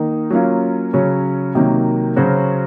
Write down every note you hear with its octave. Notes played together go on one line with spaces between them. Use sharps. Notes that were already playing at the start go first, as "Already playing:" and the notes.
Already playing: D#3 A#3 D#4
F#3 A#3 C#4 F4
C#3 F#3 C#4
C3 D#3 F#3 A#3
C#3 F#3 C#4 F#4 C5